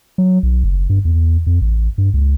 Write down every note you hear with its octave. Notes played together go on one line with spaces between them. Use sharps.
F#3
B1
F#1
G2
E2
F2
A1
G2
C#2